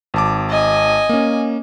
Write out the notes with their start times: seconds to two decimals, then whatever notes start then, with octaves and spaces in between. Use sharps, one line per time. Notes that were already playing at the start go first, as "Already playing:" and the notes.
0.14 G#1 A5 D6
0.49 D#5 G#5
1.09 A#3 C#4